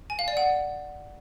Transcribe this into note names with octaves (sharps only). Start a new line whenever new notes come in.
G#5
F5
D5
F#5